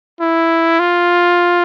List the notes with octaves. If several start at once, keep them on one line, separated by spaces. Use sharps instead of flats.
E4
F4